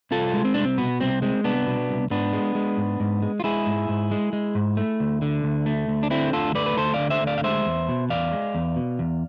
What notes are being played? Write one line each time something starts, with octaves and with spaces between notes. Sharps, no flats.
C2 F4 A4
G#3
C4
C2 D4
C4
B2 B3
C2 C4
G#3 C4
C2 B3 D4
B2
C2
G#2 B3 D4
G#3
G#3
G#2
G#2
G#3
F4
G#3 E4 G#4
G#2
G#2
G#3
G#3
G#2
A3
D2
D3
D2
A3
D2
D4
D3 C4 E4
D2 F4 A4
A3 B4 D5
B4
D2 A4 C5
D5 F5
D3
C5 E5
D2
D5 F5
F5
G#3 C5 E5
E2
B2
E2 D5 F5
G#3
E2
B2
E2